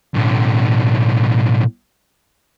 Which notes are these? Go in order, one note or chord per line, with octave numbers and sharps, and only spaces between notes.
B1 A2